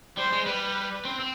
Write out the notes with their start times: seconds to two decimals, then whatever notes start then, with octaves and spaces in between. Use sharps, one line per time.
0.17 G3 C5
0.33 G#3
0.46 G3 B4
1.05 C4
1.20 C4